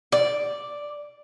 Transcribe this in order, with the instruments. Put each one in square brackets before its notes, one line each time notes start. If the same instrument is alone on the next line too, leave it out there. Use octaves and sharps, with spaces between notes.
[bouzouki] D5